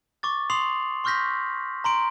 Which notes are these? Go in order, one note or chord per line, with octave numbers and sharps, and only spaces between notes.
C#6 D6 A6
C6 D#6 C7 F7 F#7
C6 C#6 F6 G6 A#6 B6
A#5 C6 D7